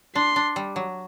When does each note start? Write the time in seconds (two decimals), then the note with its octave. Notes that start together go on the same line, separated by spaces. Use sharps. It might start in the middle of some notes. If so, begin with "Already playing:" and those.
0.15 D4 C6
0.36 D4
0.56 G3
0.76 F#3